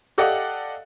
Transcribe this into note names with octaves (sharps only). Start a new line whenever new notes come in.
G4 A4 D5 D#5 F5 F#5